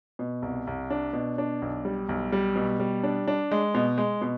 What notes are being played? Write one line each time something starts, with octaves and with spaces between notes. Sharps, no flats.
B2
C2
C2
D4
B2
D4
B1
G3
B1
G3
B2
G3
D4
D4
G#3
B2
G#3
B2